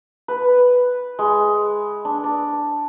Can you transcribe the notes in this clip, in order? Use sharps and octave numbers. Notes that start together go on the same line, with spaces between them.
B4
G#3
D4
D5